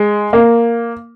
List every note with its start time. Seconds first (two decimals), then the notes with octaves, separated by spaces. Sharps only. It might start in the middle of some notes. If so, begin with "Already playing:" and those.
Already playing: G#3
0.33 A#3